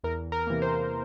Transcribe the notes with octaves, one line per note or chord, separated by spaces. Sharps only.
E2 A#4
A#4
C3 E3 A#3
C5